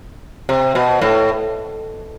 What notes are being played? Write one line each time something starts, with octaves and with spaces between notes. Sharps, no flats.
C3
B2
A2